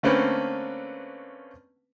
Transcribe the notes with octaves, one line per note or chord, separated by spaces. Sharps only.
D3 A3 A#3 C4 C#4 B4